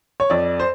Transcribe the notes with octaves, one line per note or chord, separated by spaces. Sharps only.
C#5
F2 D5
C5